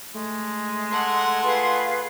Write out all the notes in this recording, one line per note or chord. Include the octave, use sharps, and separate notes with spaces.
G#3 A3
A3 F#5 C6
F4 G#4 B4 F5